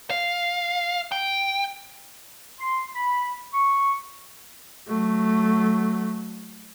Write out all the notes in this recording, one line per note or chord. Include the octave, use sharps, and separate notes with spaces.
F5
G5
C6
B5
C#6
F#3 A3